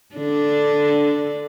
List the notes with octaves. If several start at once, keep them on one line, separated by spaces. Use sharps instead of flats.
D3 D4